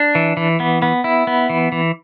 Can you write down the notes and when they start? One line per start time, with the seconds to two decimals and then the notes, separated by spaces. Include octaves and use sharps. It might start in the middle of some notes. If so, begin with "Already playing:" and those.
Already playing: D4
0.15 E3
0.37 E3
0.60 B3
0.82 B3
1.04 E4
1.27 B3
1.50 E3
1.72 E3